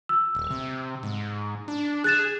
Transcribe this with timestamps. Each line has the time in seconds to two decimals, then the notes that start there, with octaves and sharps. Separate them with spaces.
0.09 E6
0.35 D#1
0.50 C3
1.03 G#2
1.68 D4
2.04 G#4 F#6 A6 E7